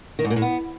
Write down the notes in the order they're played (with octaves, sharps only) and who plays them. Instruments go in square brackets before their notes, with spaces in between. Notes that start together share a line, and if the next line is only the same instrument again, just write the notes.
[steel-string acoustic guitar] D#3
G#2
A#2
A2
B3